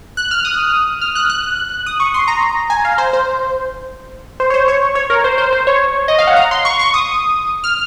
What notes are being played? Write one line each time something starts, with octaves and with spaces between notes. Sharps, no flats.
F#6
F6
D#6
F6
F#6
F#6
D#6
C#6
C6
A#5
G#5
F5
C5
C5
C5
C#5
C5
C#5
C#5
A#4
C5
C5
C5
C#5
D#5
F5
F#5
A#5
C6
C#6
C#6
D#6
F6